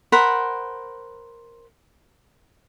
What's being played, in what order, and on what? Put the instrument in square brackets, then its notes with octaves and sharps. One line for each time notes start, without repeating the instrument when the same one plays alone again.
[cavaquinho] A#4 C5 F#5 B5